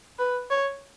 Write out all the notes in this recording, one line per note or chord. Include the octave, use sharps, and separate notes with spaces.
B4
C#5